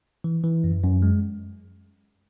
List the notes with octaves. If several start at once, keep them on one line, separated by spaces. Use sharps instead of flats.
E3
E3
F#2
F#2
G#3